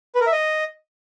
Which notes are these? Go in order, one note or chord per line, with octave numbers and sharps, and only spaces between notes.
B4
A#4
E5
D#5